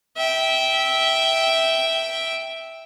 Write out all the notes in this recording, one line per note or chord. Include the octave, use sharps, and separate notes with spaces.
E5 G5